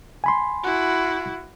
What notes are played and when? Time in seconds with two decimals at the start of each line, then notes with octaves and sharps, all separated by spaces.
0.24 G#5 B5 C6
0.63 E4 F#4